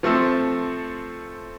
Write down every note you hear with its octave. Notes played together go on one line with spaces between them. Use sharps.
F3 A3 C4 A4